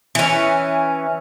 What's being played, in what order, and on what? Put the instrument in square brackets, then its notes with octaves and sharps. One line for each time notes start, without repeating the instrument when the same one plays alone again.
[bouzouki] E3 C#4